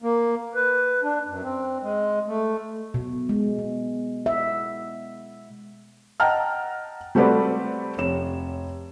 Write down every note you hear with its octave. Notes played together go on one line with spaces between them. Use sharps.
A#3
B4
D4
F#2
C4
G#3
A3
B2
G#3
B3
E5
D#5 F#5 G5 A5 A#5 F6
G3 A3 C4 F#4 B4 D5
F1 C#5 E7